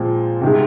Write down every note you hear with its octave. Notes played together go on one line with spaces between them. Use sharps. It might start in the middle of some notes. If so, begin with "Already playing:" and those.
Already playing: A#2 F3 G#3 C4
C3 D#3 G#3